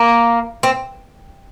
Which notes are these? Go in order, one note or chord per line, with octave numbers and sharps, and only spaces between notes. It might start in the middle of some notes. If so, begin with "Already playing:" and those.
Already playing: A#3
C4